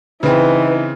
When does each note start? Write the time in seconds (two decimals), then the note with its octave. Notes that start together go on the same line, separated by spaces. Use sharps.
0.23 C#3 E3 C4 D#4 B4